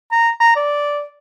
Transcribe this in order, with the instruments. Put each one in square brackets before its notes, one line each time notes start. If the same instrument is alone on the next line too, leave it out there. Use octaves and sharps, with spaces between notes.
[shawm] A#5
A#5
D5